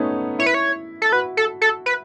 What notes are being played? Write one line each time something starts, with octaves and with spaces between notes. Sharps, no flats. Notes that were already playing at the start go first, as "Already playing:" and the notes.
Already playing: A3 B3 C#4 D#4
E4 C#5
B4
C#5
A4
F#4 B4
A4
A4
B4